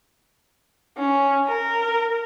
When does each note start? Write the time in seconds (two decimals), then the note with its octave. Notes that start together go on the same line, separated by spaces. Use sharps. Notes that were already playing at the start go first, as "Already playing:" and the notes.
0.98 C#4
1.47 A#4